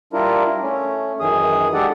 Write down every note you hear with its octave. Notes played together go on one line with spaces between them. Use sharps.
G3 D4 E4 F4 A#4
A3 C#4
F#2 D#3 E3 G#4 D#6
G#3 D4 G4 A4 D5 F#5